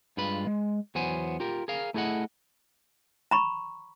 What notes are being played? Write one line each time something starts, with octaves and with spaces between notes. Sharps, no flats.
G2 G#3 F4 B4 B5
G#3
E2 F#3 B3 C5 G#5
F4 G4 A#4
G#4 A#4 F5
A3 E4 G#4 C#5 D#5 F#5
A#5 B5 C#6